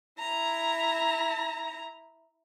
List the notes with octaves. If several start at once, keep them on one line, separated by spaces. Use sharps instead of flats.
E4 A#5